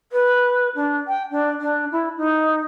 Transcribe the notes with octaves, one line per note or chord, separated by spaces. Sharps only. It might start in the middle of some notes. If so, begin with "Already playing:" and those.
B4
D4
G5
D4
D4
E4
D#4